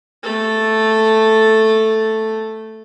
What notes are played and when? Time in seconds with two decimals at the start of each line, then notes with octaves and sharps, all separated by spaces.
0.23 A3 A4